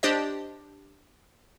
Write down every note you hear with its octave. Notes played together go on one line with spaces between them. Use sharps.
D4 G4 C5 D#5